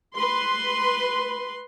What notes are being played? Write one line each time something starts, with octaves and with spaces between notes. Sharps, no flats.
B4 C6